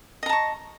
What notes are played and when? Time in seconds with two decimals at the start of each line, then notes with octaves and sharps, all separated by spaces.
0.23 D#5
0.26 A#5
0.29 A5
0.33 C#6